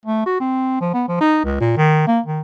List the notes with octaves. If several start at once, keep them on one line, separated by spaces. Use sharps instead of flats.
A3
F#4
C4
F3
B3
F3
D#4
C#2
A#2
D#3
A#3
D#3